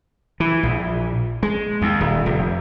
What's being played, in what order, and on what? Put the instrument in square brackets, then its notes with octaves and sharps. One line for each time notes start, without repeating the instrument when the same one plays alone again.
[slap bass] E3
A#1
G#3
D#2
D#1
F1